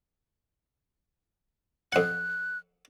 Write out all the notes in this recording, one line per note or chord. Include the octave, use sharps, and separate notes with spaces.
F2 F#5 F#6